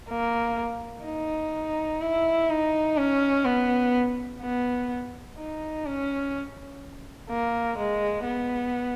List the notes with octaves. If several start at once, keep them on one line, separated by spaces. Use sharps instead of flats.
A#3
D#4
E4
D#4
C#4
B3
B3
D#4
C#4
A#3
G#3
B3